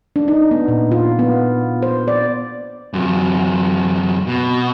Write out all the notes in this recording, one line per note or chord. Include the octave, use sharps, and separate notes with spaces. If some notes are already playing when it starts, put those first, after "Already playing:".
D4
D#4
B3
A#2
F4
B3
C5
D5
F#2 C3
B2